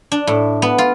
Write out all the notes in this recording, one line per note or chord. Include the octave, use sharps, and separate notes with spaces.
D4
A2
B3
F4